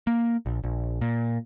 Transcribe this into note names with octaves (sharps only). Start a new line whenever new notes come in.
A#3
A#1
A#1
A#2